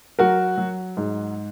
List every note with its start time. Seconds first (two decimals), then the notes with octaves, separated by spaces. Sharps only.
0.19 F#3 F#4 A#4
0.57 F#3
0.97 G#2